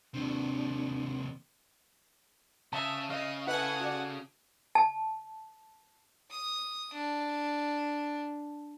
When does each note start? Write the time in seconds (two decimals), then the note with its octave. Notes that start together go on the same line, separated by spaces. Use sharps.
0.14 D#2 C3 D4
2.73 C#3 E5 A5
3.10 C#3 D#5 F5
3.47 E4 A4 B4 F#5 G#5
3.80 F#4 D5
4.75 A5
6.31 D#6
6.93 D4